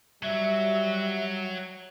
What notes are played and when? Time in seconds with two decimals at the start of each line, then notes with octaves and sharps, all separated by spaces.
0.23 F#3 G3 E5